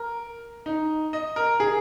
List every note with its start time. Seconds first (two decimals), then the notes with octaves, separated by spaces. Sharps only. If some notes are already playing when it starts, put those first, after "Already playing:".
Already playing: A#4
0.66 D#4
1.13 D#5
1.36 A#4
1.60 G#4